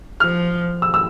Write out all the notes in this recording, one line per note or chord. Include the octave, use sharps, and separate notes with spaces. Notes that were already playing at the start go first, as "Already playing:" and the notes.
F3 F6
E6
E6